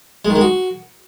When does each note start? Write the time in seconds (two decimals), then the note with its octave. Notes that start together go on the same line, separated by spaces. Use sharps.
0.25 G#3
0.30 D#3
0.36 G#3
0.41 F#4